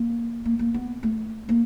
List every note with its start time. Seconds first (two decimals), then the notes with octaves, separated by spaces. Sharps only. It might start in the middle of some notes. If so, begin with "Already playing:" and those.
Already playing: A#3
0.46 A#3
0.59 A#3
0.74 B3
1.03 A3
1.49 A#3